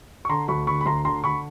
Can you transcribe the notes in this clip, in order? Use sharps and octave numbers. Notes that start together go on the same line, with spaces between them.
C#6
D3 A#5 C6
D2 B5 C#6
D3 B5 C#6
B5
D2 A#5 C6
D3 A#5 C6
D3 B5 C#6